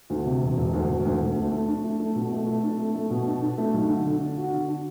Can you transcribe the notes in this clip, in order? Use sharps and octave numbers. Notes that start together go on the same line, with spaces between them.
D2
C3
E1
E1
D2
E1
D2
D2
A3
A3
D4
A3
A3
B2
A3
A3
D4
A3
A3
B2
D4
D4
A3
B1
D3
D3
D4
F#4
D3
D4